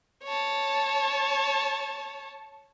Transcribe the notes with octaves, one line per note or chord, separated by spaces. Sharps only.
C#5 A5